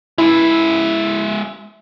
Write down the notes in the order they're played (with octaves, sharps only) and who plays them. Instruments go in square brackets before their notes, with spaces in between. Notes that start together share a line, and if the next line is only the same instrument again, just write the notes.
[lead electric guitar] G#3 E5 [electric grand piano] E4